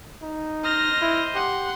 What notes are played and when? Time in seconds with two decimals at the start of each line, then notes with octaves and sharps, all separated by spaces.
0.22 D#4
0.64 C5 D#5 F6 A#6
1.02 E4
1.35 G4 F#5 C6